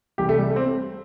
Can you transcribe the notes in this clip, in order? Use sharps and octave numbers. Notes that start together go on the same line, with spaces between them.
C2 C3 E3 G4
A3
G3
A3
C4